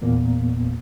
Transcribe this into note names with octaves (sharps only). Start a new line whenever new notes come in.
E2 A#2 A#3 B3